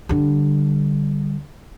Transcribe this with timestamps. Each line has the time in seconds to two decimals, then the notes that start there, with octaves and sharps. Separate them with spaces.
0.09 D3 G3